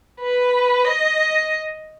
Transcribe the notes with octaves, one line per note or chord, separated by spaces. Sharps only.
B4
D#5